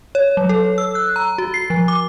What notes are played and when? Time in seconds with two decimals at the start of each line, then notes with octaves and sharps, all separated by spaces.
0.15 C#5
0.37 F#3
0.49 A4
0.78 E6
0.95 F#6
1.16 A#5
1.38 F#4
1.54 C7
1.70 F3
1.88 D6